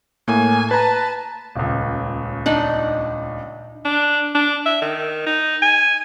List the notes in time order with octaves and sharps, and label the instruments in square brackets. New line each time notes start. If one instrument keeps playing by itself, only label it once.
[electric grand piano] A2 A#3 [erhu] G#5
[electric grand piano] B4 A#5 [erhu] A5
[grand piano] D#1 C#2
[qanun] D4 D#4 F#5
[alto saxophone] D4
D4
E5
D#3
D#4
G#5